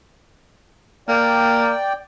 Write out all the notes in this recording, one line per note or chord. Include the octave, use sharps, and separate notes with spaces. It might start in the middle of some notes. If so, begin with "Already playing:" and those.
A#3 D5 G5